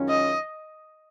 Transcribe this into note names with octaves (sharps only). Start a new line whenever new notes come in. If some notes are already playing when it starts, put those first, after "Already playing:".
Already playing: F#2 D#3 G#3 C#4 F4
D#5